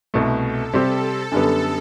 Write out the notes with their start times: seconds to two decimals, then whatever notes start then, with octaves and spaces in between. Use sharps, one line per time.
0.14 C2 B2 A3 B4
0.43 A4
0.73 C3 G3 C4 G4 A4
1.32 F#2 D3 G3 B3